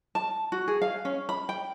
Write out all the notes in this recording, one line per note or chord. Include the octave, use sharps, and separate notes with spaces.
A5
F#4
G#4
F5
C#4
B5
G5